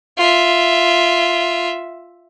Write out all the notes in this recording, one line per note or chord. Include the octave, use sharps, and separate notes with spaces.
F4 E5